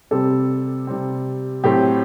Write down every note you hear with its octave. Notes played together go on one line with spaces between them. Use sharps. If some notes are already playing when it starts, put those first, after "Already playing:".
C3 G3 C4 A4
C3 G3 C4
A2 F#3 A3 C4 G4